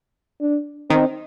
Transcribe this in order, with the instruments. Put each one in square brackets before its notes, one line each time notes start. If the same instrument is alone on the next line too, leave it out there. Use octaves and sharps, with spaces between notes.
[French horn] D4
[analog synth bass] D#3 [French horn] C4